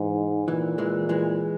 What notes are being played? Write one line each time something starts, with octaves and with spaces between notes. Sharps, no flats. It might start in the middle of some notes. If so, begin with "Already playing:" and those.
Already playing: G#2 E3
A#2 E3
E3 G#3
E3 G#3